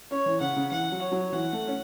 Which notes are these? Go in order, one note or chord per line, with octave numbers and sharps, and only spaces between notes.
C#4 C#5
E3
C#3 F#5
C#3
E3 F#5
F#3
C#5
F#3
E3 F#5
A3
C#4